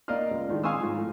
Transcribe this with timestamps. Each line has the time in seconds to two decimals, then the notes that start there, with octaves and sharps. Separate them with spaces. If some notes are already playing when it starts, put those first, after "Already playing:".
0.08 A#3 D5 D#5 F5 F6
0.31 C#2
0.48 A2 D#3 G#3 D4
0.64 F5 G#5 C6 C#6 D#6 E6
0.79 G#2 F3
0.95 A2 F3